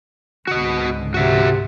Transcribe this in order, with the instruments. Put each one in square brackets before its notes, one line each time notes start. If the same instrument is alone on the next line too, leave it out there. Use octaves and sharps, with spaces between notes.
[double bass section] C#2 G#2 D3 [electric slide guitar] F#4 D#5
[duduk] C3 [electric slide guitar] F#4 E5